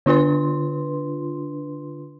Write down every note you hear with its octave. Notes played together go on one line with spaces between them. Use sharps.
D3 D4 F4 B4 C6